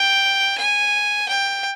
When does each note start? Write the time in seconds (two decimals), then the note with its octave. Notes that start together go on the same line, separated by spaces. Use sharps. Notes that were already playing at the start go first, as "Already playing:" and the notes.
Already playing: G5
0.58 G#5
1.28 G5